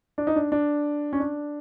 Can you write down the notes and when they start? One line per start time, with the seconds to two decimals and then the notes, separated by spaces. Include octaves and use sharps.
0.18 D4
0.27 D#4
0.36 D4
0.52 D4
1.13 C#4
1.20 D4